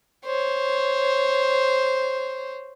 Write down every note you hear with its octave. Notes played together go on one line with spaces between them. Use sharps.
C5 C#5